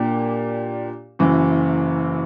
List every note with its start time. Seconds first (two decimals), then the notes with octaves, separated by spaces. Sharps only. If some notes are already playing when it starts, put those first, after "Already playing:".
Already playing: A#2 A#3 D4 G4
1.19 F#1 F#2 E3